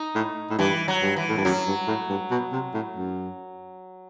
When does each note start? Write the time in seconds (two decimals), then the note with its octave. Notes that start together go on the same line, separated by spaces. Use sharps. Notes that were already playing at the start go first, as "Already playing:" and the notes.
Already playing: D#4
0.15 A2
0.51 A2
0.58 G2 E3
0.88 F#3
1.02 G2
1.16 E3
1.29 A2
1.38 G2
1.45 F#2 F#3
1.67 G2
1.87 A2
2.10 G2
2.31 B2
2.52 C3
2.74 A2
2.96 F#2